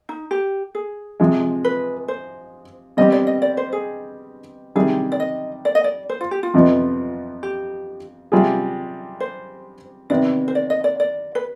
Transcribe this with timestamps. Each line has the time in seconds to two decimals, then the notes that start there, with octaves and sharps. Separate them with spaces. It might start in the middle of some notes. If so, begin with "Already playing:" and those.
0.09 D#4
0.31 G4
0.75 G#4
1.20 C3 F3 G#3
1.64 B4
2.08 C5
2.97 B2 G3 C4 G4 D#5
3.12 D5
3.27 D#5
3.42 D5
3.57 C5
3.73 G#4
4.76 C3 D#3 G3 G#4
5.12 D5
5.20 D#5
5.65 D5
5.75 D#5
5.84 D5
6.09 C5
6.21 F4
6.31 G4
6.43 F4
6.54 F2 C3 F3 B3
7.43 G4
8.32 C3 G3 C4 F4 G#4
9.20 C5
10.10 C3 D#3 B3 D5
10.48 C5
10.55 D5
10.70 D#5
10.84 D5
11.00 D5
11.35 B4